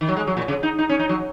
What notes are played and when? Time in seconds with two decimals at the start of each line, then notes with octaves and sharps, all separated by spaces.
0.01 D#3
0.08 F#3
0.16 G#3
0.27 F#3
0.37 A#2
0.48 C#3
0.63 D#4
0.79 D#4
0.89 C#4
0.99 D#4
1.09 F#3